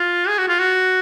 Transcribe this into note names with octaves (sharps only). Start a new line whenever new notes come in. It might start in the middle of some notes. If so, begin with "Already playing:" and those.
Already playing: F4
G#4
F#4
F4
F#4